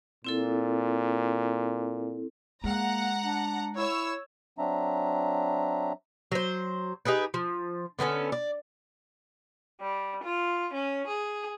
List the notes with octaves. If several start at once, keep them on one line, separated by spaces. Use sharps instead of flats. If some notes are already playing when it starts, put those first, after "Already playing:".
A#2 C4 E4 A4
G#3 A#3 F#5 A#5
D4
E4 C#5 E6
F#3 C4 D4 E5 A#5
F#3 C5
D#4 G4 G#4 B4
F3
D3 B3 C#4 A4
D5
G3
F4
C#4
G#4